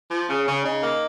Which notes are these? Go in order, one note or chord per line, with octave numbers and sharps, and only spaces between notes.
F3
C#3 C#4
C#3
C#3 D#4
A#3